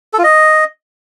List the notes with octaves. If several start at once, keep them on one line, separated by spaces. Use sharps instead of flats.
A4
F4
D#5